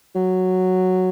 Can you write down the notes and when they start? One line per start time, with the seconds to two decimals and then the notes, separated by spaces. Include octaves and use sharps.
0.15 F#3